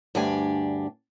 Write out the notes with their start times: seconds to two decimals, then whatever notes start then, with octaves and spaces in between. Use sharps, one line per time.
0.15 D2 G2 D4 G4 G#5